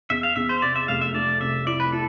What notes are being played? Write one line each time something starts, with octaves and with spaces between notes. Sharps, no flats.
E2 E5
F5
E2 E5
C5
C3 D5
E5
F1 F5
E5
A3 D5
C2 E5
E4 D5
B4
E4 A4